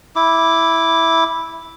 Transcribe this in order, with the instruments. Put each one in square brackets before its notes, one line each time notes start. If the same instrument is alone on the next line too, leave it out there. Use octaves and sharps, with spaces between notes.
[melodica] E4 D6